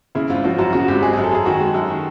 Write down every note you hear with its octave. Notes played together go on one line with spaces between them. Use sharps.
C#3 E4
G#1 F4
F3 F#4
F#2 F#4
C#3 F#4
G#1 G4
G#3 G#4
G#4
F#2
A4
F#2 G#4
D#3 F#4
G#3
F#2
D#3